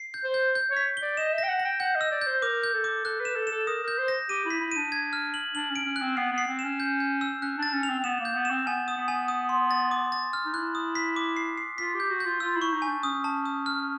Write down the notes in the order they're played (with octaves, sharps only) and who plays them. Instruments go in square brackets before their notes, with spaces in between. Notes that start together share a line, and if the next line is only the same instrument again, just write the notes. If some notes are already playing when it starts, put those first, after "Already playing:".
Already playing: [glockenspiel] C7
G6
[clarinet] C5
[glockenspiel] G6
G6
[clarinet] C#5
[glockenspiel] B6
G7
[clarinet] D5
[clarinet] D#5 [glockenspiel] E7
[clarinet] E5 [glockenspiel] A#6
[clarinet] G5
F#5
[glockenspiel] A#6
[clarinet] G5
[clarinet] F#5 [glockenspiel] G6
[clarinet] D#5
[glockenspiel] E6
[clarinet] D5
[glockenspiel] G6
[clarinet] C5
[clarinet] A#4 [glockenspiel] D6
[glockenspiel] G6
[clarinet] A4
[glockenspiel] D6
[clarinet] A4 [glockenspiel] F#6
[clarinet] B4
[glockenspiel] E7
[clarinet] A4
[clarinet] A4 [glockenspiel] E7
[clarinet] A#4 [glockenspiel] D#6
[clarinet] A#4 [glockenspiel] G6
[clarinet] C5
[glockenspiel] A#6
[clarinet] G4 [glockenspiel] D#7
[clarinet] E4
[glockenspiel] B6
[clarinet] E4
[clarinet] D4 [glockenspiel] D#7
[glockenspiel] G#6
F6
F#7
[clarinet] D4 [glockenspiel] F#7
[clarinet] C#4
[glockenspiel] D7
[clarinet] C#4
[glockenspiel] F#6
[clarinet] C4
[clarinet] B3 [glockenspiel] C7
[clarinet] B3
[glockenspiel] C7
[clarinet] C4
[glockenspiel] E7
[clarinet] C#4
[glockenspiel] G6
G6
E6
[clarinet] C#4 [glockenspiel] F#6
[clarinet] D4 [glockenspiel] A6
[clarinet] C#4
[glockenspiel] F7
[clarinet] C4
C4
[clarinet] B3 [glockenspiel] E7
[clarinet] A#3
[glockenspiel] G6
[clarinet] B3
[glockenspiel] E7
[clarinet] C4
[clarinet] B3 [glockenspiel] G#5
[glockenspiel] D#6
[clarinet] B3
[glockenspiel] G#5
D#6
C6
A6
D6
A6
F6
[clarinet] D#4
[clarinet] E4 [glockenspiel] F#6
[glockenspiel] D#6
B6
D6
C7
C7
[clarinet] F4 [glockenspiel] B6
[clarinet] G4
[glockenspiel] G6
[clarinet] F#4
[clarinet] F4 [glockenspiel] G6
[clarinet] F4 [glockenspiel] E6
[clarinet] E4
[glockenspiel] C#6
[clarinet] D#4
[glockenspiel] G#5
[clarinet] D4
[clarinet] C#4 [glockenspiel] D#6
[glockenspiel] A5
D#6
F6